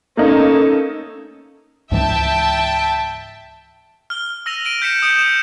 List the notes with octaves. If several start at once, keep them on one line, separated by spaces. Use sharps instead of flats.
A3 A#3 C#4 D#4 A4
C#2 G#2 E3 E5 G5 A5
F6 G7
E6 A#6 D#7 F7
A#6 D7 D#7 G7
G6 B6 C#7 E7
D#6 G6 C#7 D7
E7